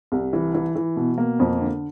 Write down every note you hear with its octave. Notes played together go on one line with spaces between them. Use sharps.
C2
E3
E3
E3
B2
A#3
F2
D3